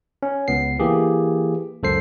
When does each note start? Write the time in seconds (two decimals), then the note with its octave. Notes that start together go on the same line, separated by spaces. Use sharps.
0.23 C#4
0.48 C#2 B3 C7
0.79 E3 A#3 G4 G#4
1.82 C#2 F#2 A4 C5 C7